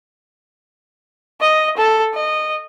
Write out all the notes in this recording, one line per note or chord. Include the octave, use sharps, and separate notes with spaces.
D#5
A4
D#5